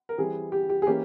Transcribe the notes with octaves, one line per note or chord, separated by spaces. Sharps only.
A#4
E3 G3 C4 G#4
G4
G4
G#4
E3 A#3 C#4 G4